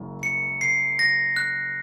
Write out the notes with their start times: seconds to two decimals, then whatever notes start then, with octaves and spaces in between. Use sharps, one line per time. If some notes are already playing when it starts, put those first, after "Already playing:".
Already playing: F#1 F#2
0.23 C#7
0.61 C7
0.99 A#6
1.36 F#6